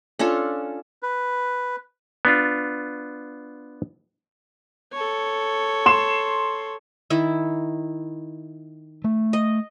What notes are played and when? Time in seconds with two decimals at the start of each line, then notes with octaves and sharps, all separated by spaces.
0.19 C#4 D4 F4 A4
1.03 B4
2.25 B3 D4 F4
4.92 A4 C#5
5.86 C6 E7
7.10 D#3 E4
9.04 A3
9.33 D#5